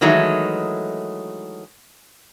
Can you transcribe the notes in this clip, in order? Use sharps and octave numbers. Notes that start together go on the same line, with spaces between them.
D#3 E3 F#3 G#3 A3 D#4